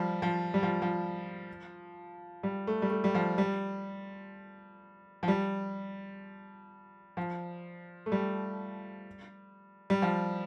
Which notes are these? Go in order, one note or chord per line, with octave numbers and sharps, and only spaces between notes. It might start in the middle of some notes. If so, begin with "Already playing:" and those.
Already playing: F3 G3
F3
G3
F3
F3
G3
A3
G3
A3
G3
F3
G3
F3
G3
F3
A3
G3
G3
F3